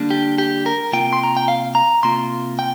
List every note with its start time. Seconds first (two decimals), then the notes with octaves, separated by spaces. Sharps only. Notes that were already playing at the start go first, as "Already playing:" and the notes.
Already playing: D3 G3 A#3 D4
0.11 G4
0.38 G4
0.66 A#4
0.92 C3 A#3 F4 G5
1.13 C6
1.23 A#5
1.37 G5
1.48 F5
1.75 A#5
2.03 C3 A#3 F4 C6
2.59 G5